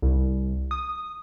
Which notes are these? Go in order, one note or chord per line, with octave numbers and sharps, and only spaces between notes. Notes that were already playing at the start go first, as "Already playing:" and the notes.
C2
D#6